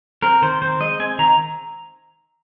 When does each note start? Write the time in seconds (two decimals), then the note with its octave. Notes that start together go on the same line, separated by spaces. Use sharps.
0.22 C4 A#4
0.42 D#3 C5
0.62 C4 C5
0.80 G#3 D#5
1.00 C4 G#5
1.19 D#3 A#5